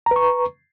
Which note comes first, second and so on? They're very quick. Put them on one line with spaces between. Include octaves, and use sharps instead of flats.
A#5 B4 C#6